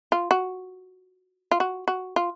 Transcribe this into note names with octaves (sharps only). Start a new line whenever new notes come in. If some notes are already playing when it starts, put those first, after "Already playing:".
F4
F#4
F4
F#4
F#4
F4